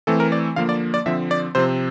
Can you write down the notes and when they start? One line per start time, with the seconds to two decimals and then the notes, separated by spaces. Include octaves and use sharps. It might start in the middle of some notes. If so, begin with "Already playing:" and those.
0.07 E3 A3 C4 A4
0.20 A#4
0.32 D5
0.56 D3 F3 A#3 F5
0.69 D5
0.94 D5
1.06 D3 F3 C4 E5
1.31 D5
1.55 C3 F3 C4 C5